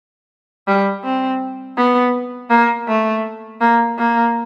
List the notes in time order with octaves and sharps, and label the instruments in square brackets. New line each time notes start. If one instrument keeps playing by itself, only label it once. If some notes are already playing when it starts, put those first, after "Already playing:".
[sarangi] G3
C4
B3
A#3
A3
A#3
A#3